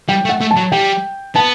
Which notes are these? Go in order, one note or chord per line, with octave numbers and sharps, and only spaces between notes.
G3 G5
A3
F#5
A3
A5
F#3
G3 G5
B3 A5